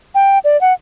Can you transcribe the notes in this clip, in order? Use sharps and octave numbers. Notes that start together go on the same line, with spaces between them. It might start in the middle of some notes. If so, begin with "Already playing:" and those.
G5
D5
F#5